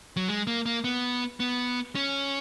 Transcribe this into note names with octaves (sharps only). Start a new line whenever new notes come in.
F#3
G#3
A#3
A#3
B3
B3
C#4